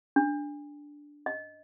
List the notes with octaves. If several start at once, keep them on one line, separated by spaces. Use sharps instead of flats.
D4
D#5